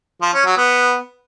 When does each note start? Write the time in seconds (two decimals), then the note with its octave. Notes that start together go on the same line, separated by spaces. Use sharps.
0.22 F3
0.34 C#4
0.45 F#3
0.57 B3